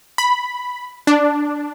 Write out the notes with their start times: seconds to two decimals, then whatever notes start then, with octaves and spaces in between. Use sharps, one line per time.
0.18 B5
1.07 D4